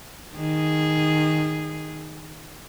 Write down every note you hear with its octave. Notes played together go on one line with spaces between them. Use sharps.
D#3 G#4